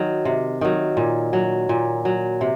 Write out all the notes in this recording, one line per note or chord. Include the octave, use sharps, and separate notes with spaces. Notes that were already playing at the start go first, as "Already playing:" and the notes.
Already playing: D#3 F#3
C3
D#3 F#3
A#2
F#3
A#2
F#3
C3